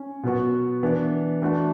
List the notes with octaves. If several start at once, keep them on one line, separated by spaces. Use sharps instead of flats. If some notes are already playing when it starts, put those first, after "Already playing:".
Already playing: C#4
B2 F#3 B3 F#4
E3 B3 D4
E3 A3 D4 F#4